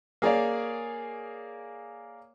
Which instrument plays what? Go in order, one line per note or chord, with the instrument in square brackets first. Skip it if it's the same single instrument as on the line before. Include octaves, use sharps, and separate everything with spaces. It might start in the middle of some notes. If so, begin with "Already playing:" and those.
[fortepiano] A#3 G#4 C#5 D5 F5